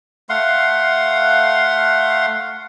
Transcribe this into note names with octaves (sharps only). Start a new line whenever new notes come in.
A3 F5 F#5 C6